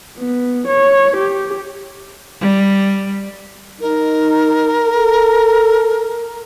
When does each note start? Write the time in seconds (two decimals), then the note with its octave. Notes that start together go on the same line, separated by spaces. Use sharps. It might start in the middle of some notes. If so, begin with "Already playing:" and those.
0.19 B3
0.67 C#5
1.17 G4
2.40 G3
3.81 D#4 A#4
4.86 A4